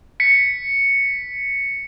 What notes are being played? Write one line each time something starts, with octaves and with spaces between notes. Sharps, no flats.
B6 C#7